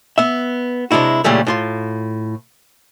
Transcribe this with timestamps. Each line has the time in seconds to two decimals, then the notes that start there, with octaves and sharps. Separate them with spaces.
0.18 B3 E5
0.91 C3 G#3 D4 E4 F#4
1.24 A#2 C#3 E3 G3 A3
1.47 A2 F4 C6